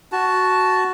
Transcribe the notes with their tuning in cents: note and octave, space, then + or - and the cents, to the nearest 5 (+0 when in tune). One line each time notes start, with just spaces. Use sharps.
F#4 +0 A5 -5